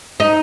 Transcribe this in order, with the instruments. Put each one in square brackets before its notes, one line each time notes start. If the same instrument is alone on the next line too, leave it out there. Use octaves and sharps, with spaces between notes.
[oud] D#4